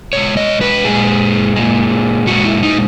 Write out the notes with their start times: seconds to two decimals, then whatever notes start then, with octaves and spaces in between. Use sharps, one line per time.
0.13 B2 G#3 C#5
0.37 D#5
0.61 B4
0.85 A#2 G#3 G#4
1.56 A#2 G#3
2.27 A#2 G#3 F#4
2.45 E4
2.63 D#4